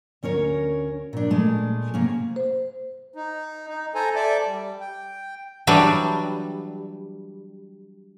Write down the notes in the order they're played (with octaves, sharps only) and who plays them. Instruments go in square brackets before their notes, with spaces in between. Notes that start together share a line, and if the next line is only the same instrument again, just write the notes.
[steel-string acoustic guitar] D2 C#4 A#4 C#5
A#2 D4
A#2 G#3 A3
C3 A#3 C#4
[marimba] C5
[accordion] D#4
D#4
A4 C5 G#5 A#5
A4 D5 E5 D6
G3
G5
[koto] E3 F#3 G3 D4